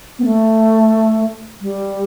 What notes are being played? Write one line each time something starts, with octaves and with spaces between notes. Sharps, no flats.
B3
A3
G3